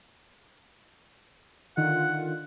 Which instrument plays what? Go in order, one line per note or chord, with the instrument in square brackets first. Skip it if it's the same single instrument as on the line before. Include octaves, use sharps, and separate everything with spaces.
[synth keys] D3 D#3 F4 [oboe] F#5